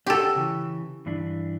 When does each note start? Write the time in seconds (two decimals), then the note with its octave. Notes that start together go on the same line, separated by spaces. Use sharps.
0.06 C#4 F#4 G4 A4
0.36 C#3 E3
1.06 G2 E3 D4